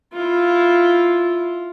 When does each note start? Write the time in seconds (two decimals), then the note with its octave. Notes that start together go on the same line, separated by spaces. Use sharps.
0.13 E4 F4